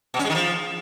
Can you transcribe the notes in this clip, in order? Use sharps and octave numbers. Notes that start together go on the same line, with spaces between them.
B2
C#4
G#3
D#3
F3